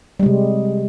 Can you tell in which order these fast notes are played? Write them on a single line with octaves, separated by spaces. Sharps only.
G3 G#3 C3